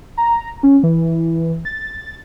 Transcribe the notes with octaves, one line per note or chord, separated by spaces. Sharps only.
A#5
C#4
E3
A6